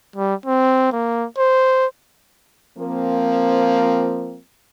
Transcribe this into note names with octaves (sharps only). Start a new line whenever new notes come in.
G3
C4
A#3
C5
F3 A#3 C4